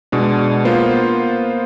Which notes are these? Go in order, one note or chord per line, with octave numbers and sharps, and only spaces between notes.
B2 G#3 D4
A#3 B3 F4 C5